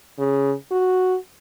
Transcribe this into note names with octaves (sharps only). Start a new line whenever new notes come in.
C#3
F#4